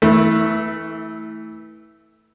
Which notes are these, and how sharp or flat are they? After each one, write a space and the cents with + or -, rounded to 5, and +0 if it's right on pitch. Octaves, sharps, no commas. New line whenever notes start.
E3 -25 A3 +0